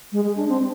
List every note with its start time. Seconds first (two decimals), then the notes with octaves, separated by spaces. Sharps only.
0.12 G#3
0.24 G#3
0.37 D4
0.49 C4